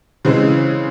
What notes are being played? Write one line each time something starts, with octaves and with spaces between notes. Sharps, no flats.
C#3 E3 G#3 C4